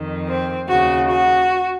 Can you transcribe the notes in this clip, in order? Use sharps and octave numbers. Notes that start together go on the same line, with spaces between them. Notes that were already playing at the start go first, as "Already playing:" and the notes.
Already playing: F2 D#3
C4
D#2 C#3 F#4
F#4